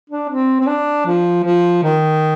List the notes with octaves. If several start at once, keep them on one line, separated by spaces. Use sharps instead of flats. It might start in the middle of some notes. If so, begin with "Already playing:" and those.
D4
C4
C4
D4
F3
F3
D#3